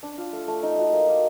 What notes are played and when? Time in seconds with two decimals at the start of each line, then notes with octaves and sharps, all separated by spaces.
0.03 D4
0.18 F4
0.33 A3
0.48 A3
0.63 D#4
0.78 F#4
0.93 A#3
1.08 A#3